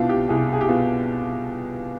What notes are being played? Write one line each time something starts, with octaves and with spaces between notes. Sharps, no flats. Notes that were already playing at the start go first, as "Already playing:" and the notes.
Already playing: C2 B2 D4 F4
G4
C2 G#4
G#4
G4
B2 F4